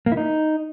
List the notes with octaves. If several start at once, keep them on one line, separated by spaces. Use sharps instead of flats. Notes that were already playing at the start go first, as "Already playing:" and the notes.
A#3
E4
D#4